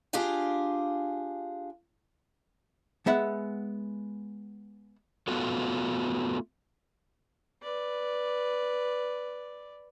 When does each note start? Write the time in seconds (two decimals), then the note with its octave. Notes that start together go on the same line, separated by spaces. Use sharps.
0.13 D4 F4 G4 G#4 F5 G#5
3.06 G#3 B3 E5 F#5
5.28 A3 B3 F4 F#4 A4
7.62 B4 D5